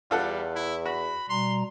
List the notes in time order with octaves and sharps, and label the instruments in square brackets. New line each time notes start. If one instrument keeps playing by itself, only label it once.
[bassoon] E2 [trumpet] G3 [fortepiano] F4 A4 F#5
[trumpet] E4
[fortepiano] F#4 [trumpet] B5
[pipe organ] B2 G3 A#5 [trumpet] C6